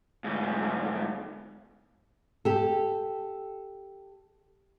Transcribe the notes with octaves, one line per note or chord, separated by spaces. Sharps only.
D2 G#2
G4 A4